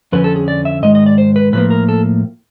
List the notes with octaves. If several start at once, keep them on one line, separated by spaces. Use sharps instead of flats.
F2 D3 F3 C#4 B4
A4
G#4
D5
E5
G#2 D#3 G#3 D#5
D#5
D5
C5
B4
A2 F3 A#3 B4
A#4
A4